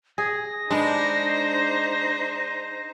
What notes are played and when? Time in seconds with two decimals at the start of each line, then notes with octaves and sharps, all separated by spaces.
0.18 G#4 A#6
0.71 G#3 D4 D#4 B4 C5